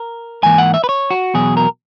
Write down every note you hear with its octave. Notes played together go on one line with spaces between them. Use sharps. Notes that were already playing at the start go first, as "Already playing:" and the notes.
Already playing: A#4
G#2 E3 A#3 G#5
F#5
E5
B4
C#5
F#4
E2 B2 F#3 G#4
A#4